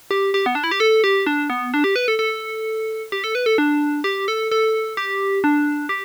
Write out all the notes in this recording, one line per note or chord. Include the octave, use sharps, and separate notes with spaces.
G4
G4
B3
D4
E4
G4
A4
G4
D4
B3
D4
G4
B4
A4
A4
G4
A4
B4
A4
D4
G4
A4
A4
G4
D4
G4